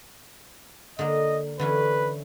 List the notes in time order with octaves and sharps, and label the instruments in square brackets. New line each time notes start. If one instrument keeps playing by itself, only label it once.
[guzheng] D3 A#3 [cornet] D#5
[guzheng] D3 E3 C#4 [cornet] B4